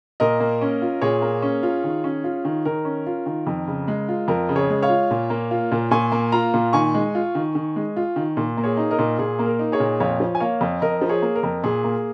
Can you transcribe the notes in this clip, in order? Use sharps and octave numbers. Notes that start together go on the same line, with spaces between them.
A#2 A#4 D#5
A#3
C#4
F4
A#2 G#4 C#5
A#3
C#4
F4
D#3
C#4
F4
D#3
D#3 A#4
C#4
F4
D#3
F2
C#3
G#3
F4
F2 A#4
C#3
G#4 C#5
G#3
C#5 F5
F4
A#2
A#3
F4
A#2
A#2 G#5 C#6
A#3
F4 F5 A#5
A#2
D#3 G#5 C#6
G#3
F4
D#3
D#3
G#3
F4
D#3
A#2
A#3
G#4 C#5
D#4
A#4 D#5
A#2
A#2 G#4
A#3
A#4
D#4
G#4 C#5
A#2
F2 C#5 F5
F3
G#5
A#3 C#5 F5
F2
F2 A#4 D#5
F3
G#4 C#5
A#3
A#4
F2
A#2 G#4
A#3